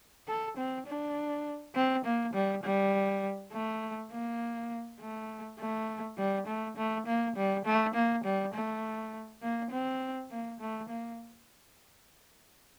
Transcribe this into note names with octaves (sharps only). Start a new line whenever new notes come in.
A4
C4
D4
C4
A#3
G3
G3
A3
A#3
A3
A3
G3
A3
A3
A#3
G3
A3
A#3
G3
A3
A#3
C4
A#3
A3
A#3